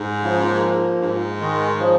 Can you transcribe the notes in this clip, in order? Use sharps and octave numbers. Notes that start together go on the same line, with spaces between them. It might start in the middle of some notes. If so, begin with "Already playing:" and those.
Already playing: G#2
C#3 F3
F3 A#3
G#2
D#3 G#3
C#3 F3